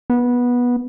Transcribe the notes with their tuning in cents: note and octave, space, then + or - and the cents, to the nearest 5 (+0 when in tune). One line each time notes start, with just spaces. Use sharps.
B3 -15